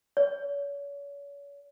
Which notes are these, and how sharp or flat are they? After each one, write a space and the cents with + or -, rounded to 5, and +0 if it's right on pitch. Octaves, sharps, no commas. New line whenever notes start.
C#5 +40